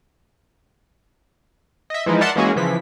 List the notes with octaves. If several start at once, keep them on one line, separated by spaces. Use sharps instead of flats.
D#5 E5
E3 F3 G#3 D#4 E4
A#4 D5 E5 F#5 A5 C6
E3 G#3 A#3 C#4 F#4 G#4
C#3 E3 F3 B6